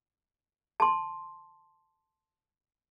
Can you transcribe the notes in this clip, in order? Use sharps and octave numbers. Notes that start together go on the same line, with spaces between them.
A5 C6